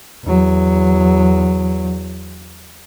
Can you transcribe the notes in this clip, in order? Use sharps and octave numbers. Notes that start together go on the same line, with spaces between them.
E2 F#3